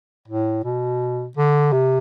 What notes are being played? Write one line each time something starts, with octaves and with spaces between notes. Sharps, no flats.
A2
B2
D3
C3